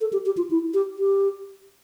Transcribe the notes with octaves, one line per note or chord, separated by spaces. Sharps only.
A4
G4
G4
F4
E4
G4
G4